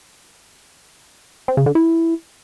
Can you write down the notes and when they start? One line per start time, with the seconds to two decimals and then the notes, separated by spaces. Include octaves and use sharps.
1.48 C4
1.57 C#3
1.66 D3
1.75 E4